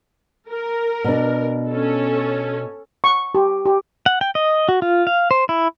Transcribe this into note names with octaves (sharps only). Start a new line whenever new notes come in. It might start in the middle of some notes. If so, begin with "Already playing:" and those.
A#4
B2 D4
C#4 A4
C#6
G4
G4
F#5
G5
D#5
F#4
F4
F5
C5
E4